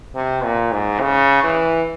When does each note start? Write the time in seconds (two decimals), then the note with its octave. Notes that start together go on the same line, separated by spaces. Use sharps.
0.15 C3
0.44 A#2
0.72 G#2
1.00 C#3
1.43 E3